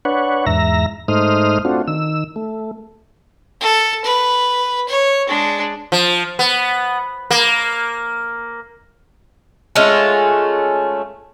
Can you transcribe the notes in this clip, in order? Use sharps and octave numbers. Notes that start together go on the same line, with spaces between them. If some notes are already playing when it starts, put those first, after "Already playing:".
D4 B4 C#5 F#5
E2 G#2 E5 A#5 A#6
G#2 A3 D#4 C5 D#6 F6
A3 C4 D4 F4 F#4
D#3 E6
A3
A4
B4
C#5
G#3 D4
F3
B3
A#3
G#3 A3 C#4 F4